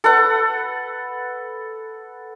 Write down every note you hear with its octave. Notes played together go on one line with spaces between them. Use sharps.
A4 B4 F#5